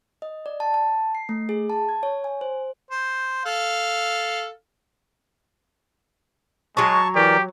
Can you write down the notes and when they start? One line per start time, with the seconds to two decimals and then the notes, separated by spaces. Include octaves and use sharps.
0.22 D#5
0.46 D5
0.60 A5
0.74 A5
1.15 C7
1.29 A3
1.49 G#4
1.70 A5
1.89 G#6
2.03 C#5
2.24 G#5
2.41 C5
2.91 C5
3.46 A4 F5
6.77 F#3 G#3 C#5 A5 C#6
7.15 E3 G4 A#4 D5